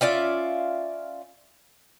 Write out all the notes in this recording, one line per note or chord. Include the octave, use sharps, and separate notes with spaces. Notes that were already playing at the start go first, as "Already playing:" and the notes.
C#4 F4 D5 E5